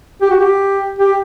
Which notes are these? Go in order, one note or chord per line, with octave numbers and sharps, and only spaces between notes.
G4
F#4
G4
G4